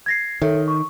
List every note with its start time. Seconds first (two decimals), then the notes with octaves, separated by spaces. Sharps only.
0.06 G#6 A#6 C7
0.42 D#3 A4 C#5 E5
0.68 C#6